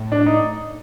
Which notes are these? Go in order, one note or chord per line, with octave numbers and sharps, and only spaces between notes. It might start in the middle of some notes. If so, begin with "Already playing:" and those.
Already playing: A2
D4
D#4